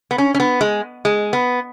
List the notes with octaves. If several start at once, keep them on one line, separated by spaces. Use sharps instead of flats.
B3
C#4
C#4
B3
G#3
G#3
B3